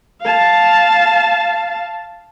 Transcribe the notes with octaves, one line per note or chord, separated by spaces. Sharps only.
F5 A5